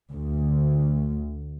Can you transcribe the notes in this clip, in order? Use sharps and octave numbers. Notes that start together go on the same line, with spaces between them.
D2